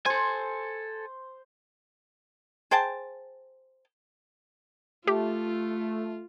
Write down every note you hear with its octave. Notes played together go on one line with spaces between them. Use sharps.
A4 C5 G#5
G#4 C5 G5 A5
A3 F4 G4